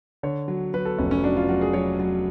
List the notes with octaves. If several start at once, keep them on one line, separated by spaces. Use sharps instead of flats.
D3 C#5
F#3
F#3 B4
A4
F1 C#4
C#4
F#3 D4
F4
F#3 F#4
G#4
F#3 C#5
F#3